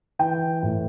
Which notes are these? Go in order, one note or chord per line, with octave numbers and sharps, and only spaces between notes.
E3 G5
A2